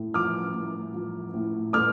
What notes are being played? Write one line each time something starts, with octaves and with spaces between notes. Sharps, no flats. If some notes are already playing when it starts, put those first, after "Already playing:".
Already playing: A2 A3
F3 D6 F6
A2
F3
A2
A3 D6 F6